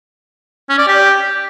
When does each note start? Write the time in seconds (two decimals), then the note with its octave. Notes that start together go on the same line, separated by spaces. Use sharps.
0.69 C#4
0.78 D5
0.88 G4